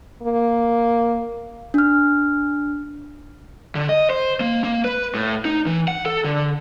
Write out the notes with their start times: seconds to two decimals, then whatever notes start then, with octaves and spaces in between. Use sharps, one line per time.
0.22 A#3
1.74 D4 F6
3.75 D3
3.89 D#5
4.10 C5
4.40 A#3
4.64 A#3
4.85 B4
5.15 A2
5.45 D#4
5.66 E3
5.88 F#5
6.06 A4
6.24 D3